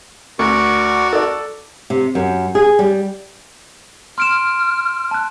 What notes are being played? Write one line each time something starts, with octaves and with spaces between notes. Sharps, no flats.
D2 F#4 A#4 D5 C#6
A4 D5
C3
F#2
G#4
G3
C6 F6 D7 E7
A5 F#6